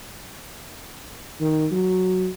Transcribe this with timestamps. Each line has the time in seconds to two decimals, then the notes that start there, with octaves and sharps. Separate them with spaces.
1.41 D#3
1.72 F#3